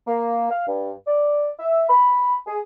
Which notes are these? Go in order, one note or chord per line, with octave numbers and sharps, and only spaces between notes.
A#3
F5
G2
D5
E5
B5
G#4